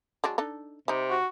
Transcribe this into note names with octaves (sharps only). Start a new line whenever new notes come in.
F#3 G#3 D4
D4 D#4 A4
C3 G3 D#4
F#4